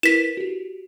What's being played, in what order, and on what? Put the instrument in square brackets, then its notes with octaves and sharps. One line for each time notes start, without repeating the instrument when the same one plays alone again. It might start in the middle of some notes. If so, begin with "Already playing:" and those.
[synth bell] E4 A#4 B4 [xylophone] B6 E7
[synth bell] F#4 G4